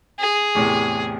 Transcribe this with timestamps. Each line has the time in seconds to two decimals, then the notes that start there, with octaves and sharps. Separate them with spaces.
0.20 G#4
0.55 E2 A2 C3